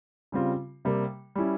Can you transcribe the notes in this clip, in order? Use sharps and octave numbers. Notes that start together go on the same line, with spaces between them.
C#3 G3 C4 F4
C3 G3 A#3
G3 C#4 E4